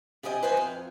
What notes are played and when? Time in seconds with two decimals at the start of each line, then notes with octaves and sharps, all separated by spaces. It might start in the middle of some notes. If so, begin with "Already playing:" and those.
0.23 C3 G3 G4 D#5 E5 G#5
0.43 B4 C5 D#5 G5 G#5
0.57 F2